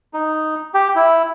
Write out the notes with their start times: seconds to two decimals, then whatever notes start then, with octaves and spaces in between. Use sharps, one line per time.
0.14 D#4
0.74 G4
0.96 E4